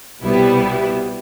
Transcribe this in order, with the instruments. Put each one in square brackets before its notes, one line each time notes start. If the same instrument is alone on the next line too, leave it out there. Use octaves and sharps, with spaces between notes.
[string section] C2 B2 G3 B3 E4